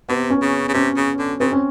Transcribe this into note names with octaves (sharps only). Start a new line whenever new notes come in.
C3 B3
C#4
C#3
C#3
C3 C#4
C#3
D3
C#3 C4
C#4